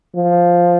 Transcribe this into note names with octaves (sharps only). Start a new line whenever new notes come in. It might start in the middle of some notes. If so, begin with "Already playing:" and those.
F3